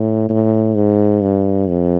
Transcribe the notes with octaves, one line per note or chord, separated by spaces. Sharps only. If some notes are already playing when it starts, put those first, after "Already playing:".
Already playing: A2
A2
G#2
G2
F2